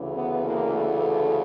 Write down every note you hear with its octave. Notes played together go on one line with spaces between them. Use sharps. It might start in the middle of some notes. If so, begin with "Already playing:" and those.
Already playing: D2 C#3 E3
B3
A#3
A3
A3